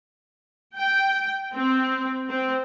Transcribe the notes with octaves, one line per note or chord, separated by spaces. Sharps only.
G5
C4
C4